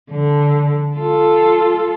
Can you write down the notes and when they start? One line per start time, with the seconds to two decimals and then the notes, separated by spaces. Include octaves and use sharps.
0.11 D3
0.95 F4 A4